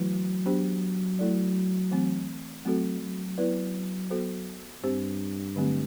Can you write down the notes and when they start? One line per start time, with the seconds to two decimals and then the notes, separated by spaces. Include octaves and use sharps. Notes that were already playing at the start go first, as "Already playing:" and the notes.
Already playing: E3 F#3 A3 E4 B4
0.46 B3 D4 G4 C5
1.19 A3 E4 A4 D5
1.91 E3 A3 C4
2.64 F#3 A3 C4 F#4 A4
3.02 F#3
3.38 B3 E4 B4 D5
4.10 B3 F#4 A4 C5
4.83 G2 C4 G4 C5
5.56 D3 F#3 A3 C4 G4